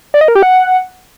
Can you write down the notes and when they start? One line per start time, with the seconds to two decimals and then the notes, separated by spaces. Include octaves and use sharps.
0.14 D5
0.21 D#5
0.28 A#4
0.35 G4
0.43 F#5